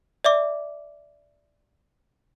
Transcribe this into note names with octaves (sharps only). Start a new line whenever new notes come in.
D5 E5 D6